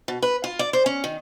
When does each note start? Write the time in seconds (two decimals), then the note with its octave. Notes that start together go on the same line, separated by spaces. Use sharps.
0.08 B2
0.23 B4
0.44 F4
0.59 D5
0.73 C5
0.86 C#4
1.04 D#3